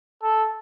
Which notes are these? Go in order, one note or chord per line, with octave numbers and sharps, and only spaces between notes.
A4